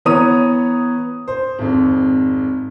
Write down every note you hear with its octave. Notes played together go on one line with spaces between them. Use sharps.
E3 B3 C#5 A#5 D#6 D#7
C5
G#1 F2